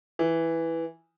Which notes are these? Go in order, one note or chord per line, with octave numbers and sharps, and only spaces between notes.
E3